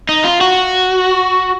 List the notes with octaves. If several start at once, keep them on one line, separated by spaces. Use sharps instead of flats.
D#4
F4
F#4